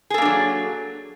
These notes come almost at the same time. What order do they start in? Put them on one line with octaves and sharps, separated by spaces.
G#4 A4 A#3 D4 F#3